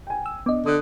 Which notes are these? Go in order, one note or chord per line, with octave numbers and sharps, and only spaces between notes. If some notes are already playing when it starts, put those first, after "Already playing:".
G5 G#5
E6
B3 D4 D#5 D6
D3 D#6 F#6